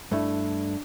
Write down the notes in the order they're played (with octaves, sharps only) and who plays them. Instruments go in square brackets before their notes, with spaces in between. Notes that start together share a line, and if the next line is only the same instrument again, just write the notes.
[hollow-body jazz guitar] G2 A3 E4 [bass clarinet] D4